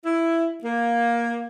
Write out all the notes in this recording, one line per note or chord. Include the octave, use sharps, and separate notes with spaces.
E4
A#3